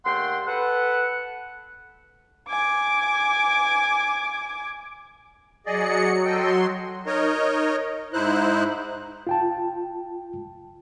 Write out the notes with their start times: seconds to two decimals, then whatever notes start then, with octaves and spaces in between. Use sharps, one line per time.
0.05 D#2 A3 F#5 G5 C6
0.47 A4 B4 F#5
2.49 G#5 D6
5.66 F#3 G#4 D5 D#5 C#7
6.26 F#3 A4 D#5 G5 C6
7.07 D#4 A#4 C#5 D#5
8.13 G#2 D#4 E4 C5 F#6
9.27 F4 G5 A5